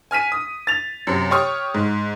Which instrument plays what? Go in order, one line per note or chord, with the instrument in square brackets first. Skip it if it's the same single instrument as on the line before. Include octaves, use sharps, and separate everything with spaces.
[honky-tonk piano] G#5 F6 B6 D#7
D#6
A6 F7
F#2 C3
G4 C#5 C#6 D#6 F6
G#2